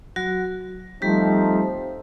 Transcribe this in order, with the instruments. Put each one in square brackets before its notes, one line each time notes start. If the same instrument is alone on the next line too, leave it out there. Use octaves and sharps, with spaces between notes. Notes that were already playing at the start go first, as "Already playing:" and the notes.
[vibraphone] F#3 F#4
[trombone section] F3 A3 C4 D#4 [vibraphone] G3 G4